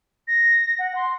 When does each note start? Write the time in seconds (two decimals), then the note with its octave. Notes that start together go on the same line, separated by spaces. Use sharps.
0.28 A#6
0.79 F#5
0.96 C6